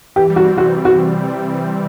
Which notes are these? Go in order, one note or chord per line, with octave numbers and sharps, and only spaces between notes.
E3 G4
G3
F#4
C4
C3 F#4
C3
C3 F#4